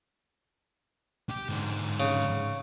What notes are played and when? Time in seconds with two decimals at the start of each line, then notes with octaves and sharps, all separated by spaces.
1.30 G4
1.49 G#2 D3
2.00 C#3